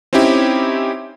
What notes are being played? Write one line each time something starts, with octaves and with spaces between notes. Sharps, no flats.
C4 C#4 D#4 E4 G4